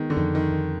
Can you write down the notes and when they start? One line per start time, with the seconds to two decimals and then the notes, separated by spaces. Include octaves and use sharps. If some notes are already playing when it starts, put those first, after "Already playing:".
Already playing: D#3 G#3 B3
0.10 D3
0.17 F2 D#3
0.35 D#3
0.52 D#3